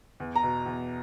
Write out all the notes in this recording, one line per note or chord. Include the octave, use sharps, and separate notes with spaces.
E2
A#5
B2
E2